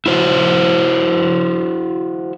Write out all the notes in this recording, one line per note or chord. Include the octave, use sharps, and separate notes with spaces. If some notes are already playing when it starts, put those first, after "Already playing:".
E4 F#4 C5